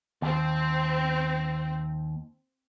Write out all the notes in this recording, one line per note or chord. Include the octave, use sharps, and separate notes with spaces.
D#2 C4